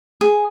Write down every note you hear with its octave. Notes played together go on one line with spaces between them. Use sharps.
G#4